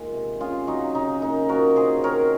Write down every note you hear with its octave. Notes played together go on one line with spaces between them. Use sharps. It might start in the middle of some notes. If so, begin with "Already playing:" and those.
Already playing: D#3 G#3 A#3 F4
C3
C#4 F4 G#4
F#3 D#4 F#4
C#3 D#4
A#3 D#4
F3 F#4 A#4
C#3 G#4 C5
C4 A#4 C#5